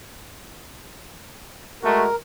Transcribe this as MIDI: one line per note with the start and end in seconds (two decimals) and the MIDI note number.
1.83 2.07 56
1.83 2.07 57
1.83 2.07 66
1.83 2.16 70